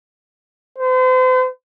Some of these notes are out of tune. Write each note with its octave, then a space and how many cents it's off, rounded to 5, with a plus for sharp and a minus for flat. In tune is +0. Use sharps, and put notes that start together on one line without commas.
C5 -40